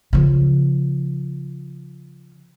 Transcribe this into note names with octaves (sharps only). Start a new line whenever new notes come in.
C#3 F3